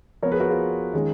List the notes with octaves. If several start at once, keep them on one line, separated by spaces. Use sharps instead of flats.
F3 B3 A#4 C#5
G#4 B4
F#4 A#4
F4 G#4
D#3 G#3 C#4